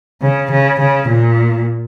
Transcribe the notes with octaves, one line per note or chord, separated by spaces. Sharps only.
C#3
C#3
C#3
A#2